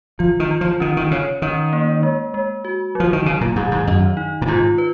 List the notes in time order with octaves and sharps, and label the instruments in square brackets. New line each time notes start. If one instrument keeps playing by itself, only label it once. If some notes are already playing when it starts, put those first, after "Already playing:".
[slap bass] F3 [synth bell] F4
[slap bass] D#3
[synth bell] F4
[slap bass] F3
[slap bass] D#3 [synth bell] C#4
[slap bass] D#3
[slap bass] C#3 [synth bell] C#5
[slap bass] D#3 [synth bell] C#4
[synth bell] A#3
G#3
G#3
F#4
[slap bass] F3 [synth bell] F#3
[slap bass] D#3
[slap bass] C#3 [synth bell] F#3
[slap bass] A#2
[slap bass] G#2 [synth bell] D#3
[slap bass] G#2
[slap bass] F#2 [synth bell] D#5
[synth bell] D#4
[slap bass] A#2
[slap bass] G#2 [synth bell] F4
[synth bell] B4